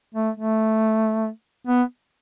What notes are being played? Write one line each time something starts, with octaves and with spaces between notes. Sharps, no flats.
A3
A3
B3